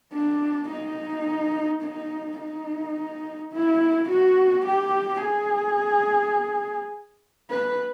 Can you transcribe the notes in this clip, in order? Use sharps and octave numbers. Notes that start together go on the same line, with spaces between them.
D4
D#4
D#4
D#4
E4
F#4
G4
G#4
B4